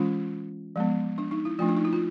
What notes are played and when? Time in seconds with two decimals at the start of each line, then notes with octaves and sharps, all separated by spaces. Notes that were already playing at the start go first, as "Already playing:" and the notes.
Already playing: E3 G#3 C#4 F4
0.76 F3 G#3 B3
1.18 D4
1.31 D#4
1.45 E4
1.59 F3 A3 D4 F4
1.69 D4
1.77 D#4
1.85 E4
1.93 F4